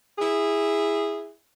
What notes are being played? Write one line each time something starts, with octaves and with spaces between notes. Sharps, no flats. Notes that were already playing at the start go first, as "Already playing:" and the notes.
E4 G#4